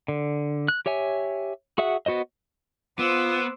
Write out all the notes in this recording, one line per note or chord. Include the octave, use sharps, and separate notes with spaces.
D3
F#6
G4 C#5 E5 G#5
F#4 G#4 E5 F#5
B3 F#4 C5 D#5
B3 F4 C5 D6 E6